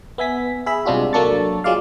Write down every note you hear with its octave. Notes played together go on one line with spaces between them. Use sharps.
B3 E5 G#5 B6
G#4 E5 B5
C2 C3 G#3 D4 F4 F#4
F#3 A#3 D4 A4 C#6 A6
F#3 G#3 F4 D5 F5